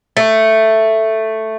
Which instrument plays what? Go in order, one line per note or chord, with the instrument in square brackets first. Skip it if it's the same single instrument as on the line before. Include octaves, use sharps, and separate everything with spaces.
[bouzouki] A3